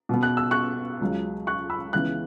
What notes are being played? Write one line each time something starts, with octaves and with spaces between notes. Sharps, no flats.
B2 B3
F#6
E6
C#6 F#6
C#2 C#3 F#3
C#6 F#6
B5 E6
C#2 C#3 E3 B3 F#6